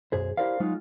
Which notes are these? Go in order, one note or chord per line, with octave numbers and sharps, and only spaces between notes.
B1 F#2 G#4 C5
E4 G4 A#4 C5 D5 F5
F#3 G#3 D#4 F4